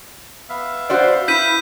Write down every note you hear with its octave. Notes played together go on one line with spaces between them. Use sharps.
B3 E5 F5
F#4 C5 D5
E4 G6 B6 D#7